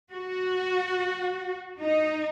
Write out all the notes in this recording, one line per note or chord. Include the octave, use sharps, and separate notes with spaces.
F#4
D#4